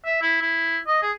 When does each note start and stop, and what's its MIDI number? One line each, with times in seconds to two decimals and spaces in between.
0.05 0.22 76
0.22 0.37 64
0.42 0.79 64
0.87 1.01 75
1.02 1.12 68